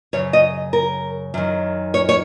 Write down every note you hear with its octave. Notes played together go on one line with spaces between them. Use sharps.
F#2 C#3 C#5
D#5
A#4
F#2 D#3
C#5
C#5